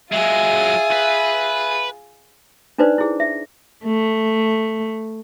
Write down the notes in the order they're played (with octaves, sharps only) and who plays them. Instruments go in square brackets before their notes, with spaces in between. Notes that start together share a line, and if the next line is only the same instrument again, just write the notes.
[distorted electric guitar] F#3 G#3 [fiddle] F4 G#4 [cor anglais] E5
[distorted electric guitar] B4
[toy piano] D4 D#4 B4 C5 D5
E4 G#4
E5
[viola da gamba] A3